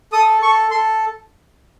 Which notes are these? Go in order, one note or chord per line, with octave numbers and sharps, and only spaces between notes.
A4 D#6
A4 C#6
A4 C6